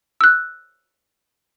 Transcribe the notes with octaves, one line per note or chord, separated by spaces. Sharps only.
E6 F#6